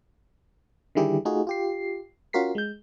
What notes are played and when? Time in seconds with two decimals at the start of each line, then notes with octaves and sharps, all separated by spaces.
0.95 D3 D#3 G3 E4 G4 G#4
1.25 A3 D#4 F4 F#4 G#4
1.47 F4 G4 C7
2.33 C#4 F4 F#4 A#4 B6 C7
2.55 G#3 G6